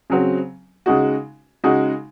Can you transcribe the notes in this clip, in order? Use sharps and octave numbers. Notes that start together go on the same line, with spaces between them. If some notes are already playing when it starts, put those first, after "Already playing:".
C#3 F#3 C4
C#3 G#3 D#4 F#4
C#3 G#3 D#4 F#4